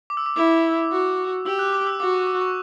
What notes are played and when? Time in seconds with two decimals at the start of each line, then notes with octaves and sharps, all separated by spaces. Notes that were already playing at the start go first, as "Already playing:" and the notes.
0.10 D6
0.17 E6
0.26 D6
0.36 E4 D6
0.91 F#4
1.46 G4 E6
1.59 F#6
1.73 D6
1.87 E6
2.00 F#4 D6
2.14 C#6
2.27 D6
2.41 C#6